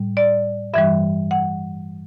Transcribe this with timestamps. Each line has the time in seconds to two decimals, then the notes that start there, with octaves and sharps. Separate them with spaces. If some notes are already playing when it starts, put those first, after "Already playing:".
Already playing: A2 G3
0.17 D5
0.74 G2 E3 G3 E5
1.31 F#5